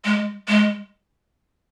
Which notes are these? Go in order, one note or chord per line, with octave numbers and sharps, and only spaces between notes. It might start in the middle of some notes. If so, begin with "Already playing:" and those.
G#3
G#3